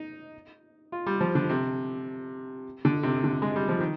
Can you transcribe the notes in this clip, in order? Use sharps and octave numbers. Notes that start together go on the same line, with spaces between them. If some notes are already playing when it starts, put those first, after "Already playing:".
Already playing: D#4
F4
G3
F3
D3
C3
D3
C3
D3
G#3
G3
F3
D#3